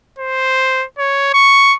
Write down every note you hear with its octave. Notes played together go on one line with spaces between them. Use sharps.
C5
C#5
C#6